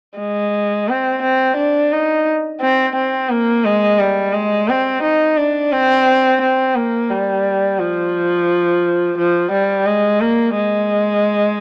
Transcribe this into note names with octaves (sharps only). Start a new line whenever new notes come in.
G#3
C4
C4
D4
D#4
C4
C4
A#3
G#3
G3
G#3
C4
D#4
D4
C4
C4
A#3
G3
F3
F3
G3
G#3
A#3
G#3